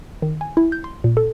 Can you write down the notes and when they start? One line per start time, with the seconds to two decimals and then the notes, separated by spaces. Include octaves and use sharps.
0.22 D#3
0.41 G#5
0.57 E4
0.72 G6
0.84 C6
1.04 A#2
1.17 A4